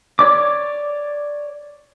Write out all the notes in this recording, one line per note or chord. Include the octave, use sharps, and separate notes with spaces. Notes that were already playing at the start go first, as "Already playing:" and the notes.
C#5 D5 D6